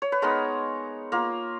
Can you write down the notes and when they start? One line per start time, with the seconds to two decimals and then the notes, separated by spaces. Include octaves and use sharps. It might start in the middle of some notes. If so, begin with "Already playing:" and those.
0.02 C#5
0.12 B4
0.22 G#3 B3 D#4 A#4
1.12 A#3 F4 A#4